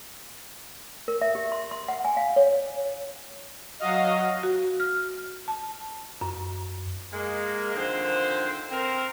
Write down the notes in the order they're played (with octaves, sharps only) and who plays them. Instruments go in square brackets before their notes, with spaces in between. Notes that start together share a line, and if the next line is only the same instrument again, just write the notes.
[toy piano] A#4
E5
G4
C6
C6
F#5
G#5
F5
C#5
[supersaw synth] F#3 F#4 F5 [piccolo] D#5
[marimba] F#4
F6
A5
F#2
[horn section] G#3 A#3
D3 D#3 F3 C4 C5
C4 A#4